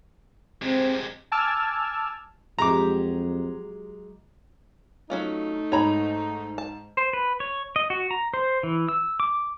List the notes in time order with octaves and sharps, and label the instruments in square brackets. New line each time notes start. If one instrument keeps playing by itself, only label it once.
[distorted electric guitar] C3 G#3 [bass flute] C4
[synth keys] G#5 A5 D6 E6 F6 G#6
[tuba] F2 [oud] F#3 G#3 G4 [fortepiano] A#5 D6
[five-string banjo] F#3 C#4 F4 [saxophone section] A3 D#4
[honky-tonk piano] G#2 A#5 [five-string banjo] C#5 B5
[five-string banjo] A5
[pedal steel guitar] C5
B4
C#5
D#5
F#4
A#5
C5
E3
E6
D6